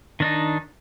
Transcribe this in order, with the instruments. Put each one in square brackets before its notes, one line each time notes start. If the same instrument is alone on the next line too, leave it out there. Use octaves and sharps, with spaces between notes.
[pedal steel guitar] D#3 D4 D#4